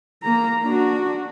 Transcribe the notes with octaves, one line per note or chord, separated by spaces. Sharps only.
A#3 A#5
D4 F#4